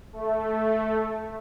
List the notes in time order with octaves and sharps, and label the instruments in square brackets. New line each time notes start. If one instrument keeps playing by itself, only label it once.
[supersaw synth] A3